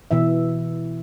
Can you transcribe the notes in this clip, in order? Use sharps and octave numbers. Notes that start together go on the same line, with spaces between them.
B2 E3 E5